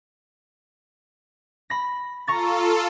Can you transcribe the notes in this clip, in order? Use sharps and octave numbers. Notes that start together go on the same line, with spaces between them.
B5 A#6
F4 A4 A#5 C#6 A6